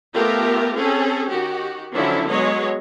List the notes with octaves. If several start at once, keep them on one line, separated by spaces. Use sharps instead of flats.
A3 B3 F4 G4 A#4
C4 C#4 G#4 A4
D#3 F#4 G4
D3 F3 F#3 C#4 D4 E4
F#3 G#3 B3 C#5 D#5